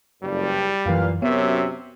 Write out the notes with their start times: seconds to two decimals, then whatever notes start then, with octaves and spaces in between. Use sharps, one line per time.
0.23 F#1 G2 G3
0.86 F#2 A#2 E3 B4 F5
1.22 F#2 C3 B3 C#5 E5